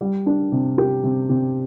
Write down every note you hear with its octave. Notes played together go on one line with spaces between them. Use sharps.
G3
D4
C3
G4
C3
C3